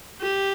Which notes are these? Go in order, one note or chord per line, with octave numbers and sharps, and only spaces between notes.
G4